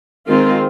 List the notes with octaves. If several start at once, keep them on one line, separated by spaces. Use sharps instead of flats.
D#3 G#3 C4 F4